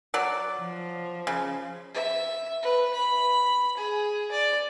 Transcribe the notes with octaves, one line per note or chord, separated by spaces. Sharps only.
F#3 D5
F3
C#3
E5
B4
B5
G#4
D5